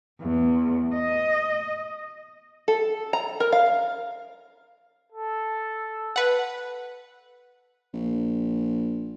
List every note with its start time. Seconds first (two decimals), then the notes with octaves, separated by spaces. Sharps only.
0.22 E2
0.95 D#5
2.68 A4
3.13 A#5
3.40 A#4
3.52 F5
5.13 A4
6.16 B4 F#5
7.94 A#1